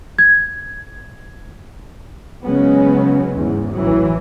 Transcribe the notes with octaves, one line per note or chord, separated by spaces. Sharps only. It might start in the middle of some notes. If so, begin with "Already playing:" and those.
G#6
C#3 F#3 G#3 B3 C#4
E2 G#2
A1 E3 F#3